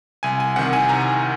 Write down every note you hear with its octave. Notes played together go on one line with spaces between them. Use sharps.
C2 G#5
G#5
C3 D#3 F#5
G#5
C2 A#5